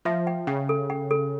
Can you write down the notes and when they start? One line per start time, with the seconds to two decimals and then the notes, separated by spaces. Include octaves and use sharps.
0.05 F3 E5
0.27 G5
0.47 C#3 G5
0.69 A4
0.90 G5
1.11 A4